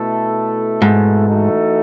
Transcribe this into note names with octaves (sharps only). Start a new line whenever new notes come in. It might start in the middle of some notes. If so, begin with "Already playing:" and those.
Already playing: B2 A3 E4 A4
G#2
E3 A3 D#4 F#4 A4